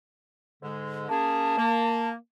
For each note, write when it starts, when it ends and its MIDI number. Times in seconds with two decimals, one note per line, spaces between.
0.62 1.08 44
0.62 1.08 50
0.62 1.08 56
1.09 1.56 58
1.09 1.56 61
1.09 1.56 68
1.09 2.09 81
1.58 2.14 58